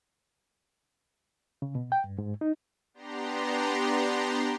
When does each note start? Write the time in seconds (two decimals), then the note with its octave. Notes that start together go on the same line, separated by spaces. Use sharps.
1.62 C#3
1.75 B2
1.92 G5
2.04 G2
2.18 G#2
2.41 D#4
2.94 B3 D4 G4 A#5 C6